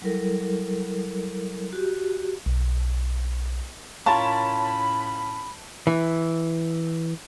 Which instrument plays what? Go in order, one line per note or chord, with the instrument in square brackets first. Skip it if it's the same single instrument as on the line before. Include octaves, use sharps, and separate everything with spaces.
[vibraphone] F#3 G3 E4 A4 A#4
F#4 G4
[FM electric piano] B1
[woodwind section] A2 C#4 B5 [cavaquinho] F4 A#4 C#5 [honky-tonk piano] A5
[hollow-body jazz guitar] E3